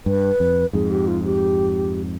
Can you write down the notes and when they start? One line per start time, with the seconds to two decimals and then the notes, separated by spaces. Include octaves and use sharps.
0.06 G2 B4
0.40 F2
0.73 F2 G#2 G#4
0.90 G4
1.07 F4
1.24 G4